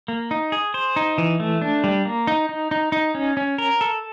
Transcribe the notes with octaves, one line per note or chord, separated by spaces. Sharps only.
A#3
D#4
G#4
C5
D#4
E3
A3
D4
G3
A#3
D#4
D#4
D#4
D#4
C#4
C#4
A#4
A4